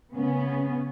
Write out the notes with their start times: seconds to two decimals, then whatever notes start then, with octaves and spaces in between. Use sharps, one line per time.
0.12 C#3 B3 C#4